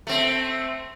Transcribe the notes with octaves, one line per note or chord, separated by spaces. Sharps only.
A3 C4